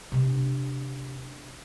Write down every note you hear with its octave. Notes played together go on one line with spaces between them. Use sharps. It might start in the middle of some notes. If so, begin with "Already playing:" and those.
C3 D4